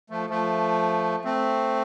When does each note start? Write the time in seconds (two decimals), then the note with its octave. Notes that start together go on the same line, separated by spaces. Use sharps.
0.10 F3 A3
0.29 F3 A3
1.24 A3 C4